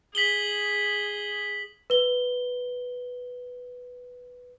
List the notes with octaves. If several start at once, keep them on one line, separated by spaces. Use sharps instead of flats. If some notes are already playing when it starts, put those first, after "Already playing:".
G#4 B6 F#7 G7
B4 G7